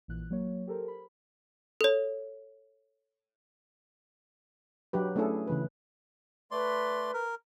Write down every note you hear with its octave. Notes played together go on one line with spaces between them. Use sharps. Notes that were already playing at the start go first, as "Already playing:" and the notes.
A#1 A#2 E3 F#6
F#3 A#3 C#5
G4 A4 A#4 C5
B5
A4 C#5
F#3 D4 G4 B4
A3 C#4 D4 E4 G#4 A4
C#3 E3 B4
A3 B4 D5 C6
A#4